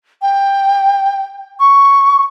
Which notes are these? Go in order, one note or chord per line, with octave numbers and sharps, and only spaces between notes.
G5
C#6